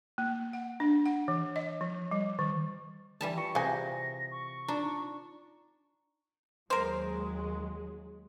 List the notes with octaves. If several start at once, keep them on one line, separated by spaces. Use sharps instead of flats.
A#3
F#5
D4
F#5
E3
D#5
F3
G3
D#3
E3 G3 A5
F4 G5 C#6 C#7
C3 G#4 F5 G#5 A#6
C#6
D4 D#4 F4 A#5
D#2 F#3 G#3 A#4 C5